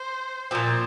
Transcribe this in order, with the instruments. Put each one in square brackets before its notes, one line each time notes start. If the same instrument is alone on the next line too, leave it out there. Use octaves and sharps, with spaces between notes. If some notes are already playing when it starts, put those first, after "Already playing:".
Already playing: [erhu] C5
[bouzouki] A#2 F3 C4